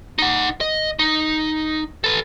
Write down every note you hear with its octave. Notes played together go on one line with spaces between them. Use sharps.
D#4 F#5
D#5
D#4
A4 B4